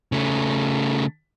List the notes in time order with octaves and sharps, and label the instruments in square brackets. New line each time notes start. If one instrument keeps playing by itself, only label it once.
[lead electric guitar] C#3 A3